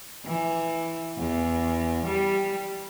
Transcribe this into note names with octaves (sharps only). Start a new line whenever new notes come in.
E3
E2
G3